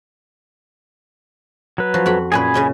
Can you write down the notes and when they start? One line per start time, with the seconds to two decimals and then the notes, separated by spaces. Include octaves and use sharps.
1.78 F#3 B4
1.94 F3 F#4
2.06 F2 F#4 B5
2.32 F#2 A#2 G#4 B4 G#5 B5
2.54 C#3 C#4 D#5